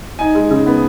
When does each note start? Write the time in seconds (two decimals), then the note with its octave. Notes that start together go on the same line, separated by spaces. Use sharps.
0.19 D#4 G#5
0.35 G#3
0.51 C#3
0.66 B3